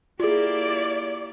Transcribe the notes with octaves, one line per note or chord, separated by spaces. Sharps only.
A#3 E4 F4 G4 G#4 D5